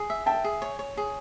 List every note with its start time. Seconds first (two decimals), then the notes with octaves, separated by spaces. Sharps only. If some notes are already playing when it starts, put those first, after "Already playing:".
Already playing: G#4
0.10 E5
0.26 E5 G5 A5
0.44 G#4
0.62 C#5
0.79 C#5
0.97 G#4